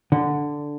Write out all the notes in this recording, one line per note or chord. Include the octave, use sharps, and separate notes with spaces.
D3